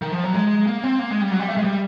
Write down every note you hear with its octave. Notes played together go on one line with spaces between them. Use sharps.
D#3
F3
F#3
G#3
A#3
C4
A#3
G#3
G3
F#3
G3
A3
G#3
G3